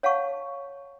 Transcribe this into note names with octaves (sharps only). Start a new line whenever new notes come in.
C#5 F5 F#5 A5 C#6